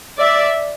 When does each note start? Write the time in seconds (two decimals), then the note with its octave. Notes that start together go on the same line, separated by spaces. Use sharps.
0.18 D5 E5